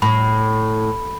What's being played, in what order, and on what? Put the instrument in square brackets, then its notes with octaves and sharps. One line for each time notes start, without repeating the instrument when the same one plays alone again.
[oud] A2 [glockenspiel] B5